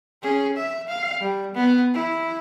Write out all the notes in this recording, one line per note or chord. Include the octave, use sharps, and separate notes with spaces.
C#4 G#4
E5
F5
G3
B3
E4